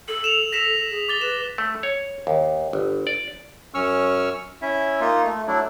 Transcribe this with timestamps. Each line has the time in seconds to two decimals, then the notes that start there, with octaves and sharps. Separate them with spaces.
0.08 A4 F#7
0.24 E7 F7
0.53 A4 A#6 B6 E7
0.91 G#4
1.09 D6 A6 G7
1.21 B4 E7
1.58 A3
1.83 C#5
2.27 D#2
2.73 G1
3.07 D5
3.74 F#2 C#4 C#6 E6 F6
4.62 C#4 E4 E5
5.00 A#3 D#4 F4
5.24 A3
5.47 F#3 A3 D4 E4